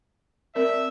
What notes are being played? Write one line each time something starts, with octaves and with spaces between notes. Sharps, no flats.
C4 A#4 D5 E5